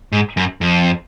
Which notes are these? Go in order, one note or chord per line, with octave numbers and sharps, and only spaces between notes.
G#2
F#2
F2